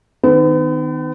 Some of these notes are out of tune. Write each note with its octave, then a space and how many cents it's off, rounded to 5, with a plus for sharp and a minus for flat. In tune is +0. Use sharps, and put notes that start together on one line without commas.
D#3 +0 B3 +40